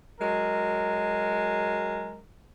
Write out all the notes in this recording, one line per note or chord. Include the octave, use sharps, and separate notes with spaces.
F#3 G#3 A#4